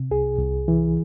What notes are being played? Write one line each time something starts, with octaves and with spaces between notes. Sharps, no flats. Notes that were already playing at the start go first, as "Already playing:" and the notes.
Already playing: C3
C2 G#4
C2
E3